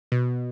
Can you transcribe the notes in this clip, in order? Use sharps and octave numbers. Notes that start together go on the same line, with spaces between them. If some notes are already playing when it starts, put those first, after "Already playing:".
B2